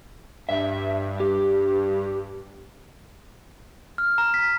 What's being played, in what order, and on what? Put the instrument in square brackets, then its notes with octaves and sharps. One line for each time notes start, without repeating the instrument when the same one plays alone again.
[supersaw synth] G2 [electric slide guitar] E5
[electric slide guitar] G4
[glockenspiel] F6
A#5
B6